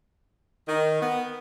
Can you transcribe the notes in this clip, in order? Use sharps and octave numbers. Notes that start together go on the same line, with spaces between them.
D#3
B3